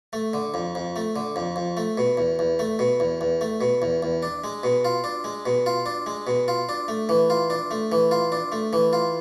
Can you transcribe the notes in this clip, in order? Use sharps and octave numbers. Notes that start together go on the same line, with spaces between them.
A3
D3
F2
F2
A3
D3
F2
F2
A3
B2
E2
E2
A3
B2
E2
E2
A3
B2
E2
E2
D4
G#3
B2
F4
D4
G#3
B2
F4
D4
G#3
B2
F4
D4
A3
E3
F4
D4
A3
E3
F4
D4
A3
E3
F4